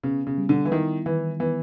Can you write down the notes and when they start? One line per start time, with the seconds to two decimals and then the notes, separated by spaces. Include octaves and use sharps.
0.03 C#3 B3
0.27 C#3
0.38 G3
0.49 D3
0.65 E3
0.71 D#3 E4
1.06 D#3 E3
1.40 E3 B3